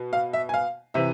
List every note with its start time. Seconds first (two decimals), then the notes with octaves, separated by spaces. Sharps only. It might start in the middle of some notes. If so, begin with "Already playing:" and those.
Already playing: B2
0.13 F5
0.33 E5
0.49 G#5
0.54 F5
0.94 C3 E3 E5